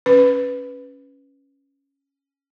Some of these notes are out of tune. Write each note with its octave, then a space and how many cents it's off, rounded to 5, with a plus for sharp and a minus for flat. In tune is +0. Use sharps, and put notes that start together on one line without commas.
C#4 +0 B4 +0